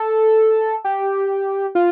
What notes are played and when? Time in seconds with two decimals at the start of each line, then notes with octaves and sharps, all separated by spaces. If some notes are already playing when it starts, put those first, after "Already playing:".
Already playing: A4
0.84 G4
1.75 F4